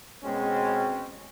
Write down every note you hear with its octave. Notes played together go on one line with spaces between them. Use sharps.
B2 G#3 C4 C#4